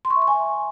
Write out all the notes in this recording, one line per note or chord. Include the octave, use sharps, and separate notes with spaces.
C6
C#6
E5
C#6
G#5